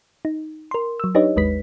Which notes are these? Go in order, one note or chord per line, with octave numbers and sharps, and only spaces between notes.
D#4
A#4 C6
F#3 E6
D4 D#4 G4 B4 C#5 D#5
G#1 D#2 G#3 B4 B6